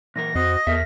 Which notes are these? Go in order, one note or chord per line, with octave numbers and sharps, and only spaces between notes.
A#2 E3 A#4 A#6
F2 F#4 C5 D#5
E2 A4 A#4 E5